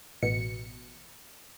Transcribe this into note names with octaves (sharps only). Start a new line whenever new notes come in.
A1 B2 C#7